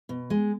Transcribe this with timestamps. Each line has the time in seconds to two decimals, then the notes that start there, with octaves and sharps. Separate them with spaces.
0.09 B2
0.30 G#3